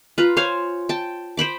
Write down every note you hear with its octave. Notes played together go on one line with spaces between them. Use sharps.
F4 B4 A#5
C5 C#5 F5 G#5
G5 A5
C5 G5 B5 D6